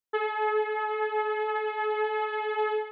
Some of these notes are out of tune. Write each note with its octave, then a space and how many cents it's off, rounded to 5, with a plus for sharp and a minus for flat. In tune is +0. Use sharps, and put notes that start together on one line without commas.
A4 -45